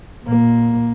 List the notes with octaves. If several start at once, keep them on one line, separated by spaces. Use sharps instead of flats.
A#2 A#3